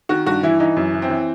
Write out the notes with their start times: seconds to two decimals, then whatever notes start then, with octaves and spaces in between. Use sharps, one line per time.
0.09 D#3 F#4
0.26 G2 F#4
0.43 E3 E4
0.60 E3 D#4
0.77 F#2
0.94 E3
1.02 C4
1.10 E3